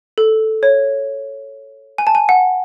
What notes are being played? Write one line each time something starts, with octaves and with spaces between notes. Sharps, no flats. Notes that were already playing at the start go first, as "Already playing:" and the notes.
A4
C#5
G#5
A5
G#5
F#5